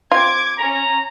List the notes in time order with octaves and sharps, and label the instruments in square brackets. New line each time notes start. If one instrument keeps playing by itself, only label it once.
[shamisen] C4 F4 [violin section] D6 G#6
[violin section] C#4 [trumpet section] A#5